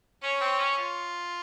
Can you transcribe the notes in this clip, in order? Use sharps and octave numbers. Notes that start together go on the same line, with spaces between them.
C#4 C#5
C4
C#4
F4